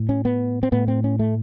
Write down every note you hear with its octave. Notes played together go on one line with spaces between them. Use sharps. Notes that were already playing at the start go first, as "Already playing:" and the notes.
Already playing: A2
C#4
B3
C4
A2 B3
C4
C#4
A3